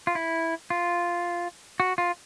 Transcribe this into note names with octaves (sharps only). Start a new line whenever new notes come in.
F4
E4
F4
F#4
F4